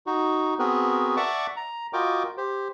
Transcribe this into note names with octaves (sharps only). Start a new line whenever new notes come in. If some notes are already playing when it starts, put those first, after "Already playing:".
D#4 F#4
B3 C4 F#4 G#4 A#4 B4
D5 E5 F#5 A5 C#6 D6
A#5
F4 F#4 A#4 D#5 G5 D6
G4 C5